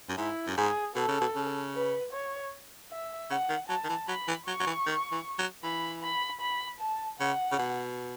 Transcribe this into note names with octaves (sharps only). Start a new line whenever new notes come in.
F#2
G#2 E4
F#2
G#2 G#4
B2 A4
C#3
B2
C#3
B4
C#5
E5
C#3 F#5
D#3
F#3 A5
D#3
E3
F#3 B5
E3
F#3 C#6
F#3
E3
D#3
E3
F#3
E3 B5
B5
B5
A5
C#3 F#5
C#3
B2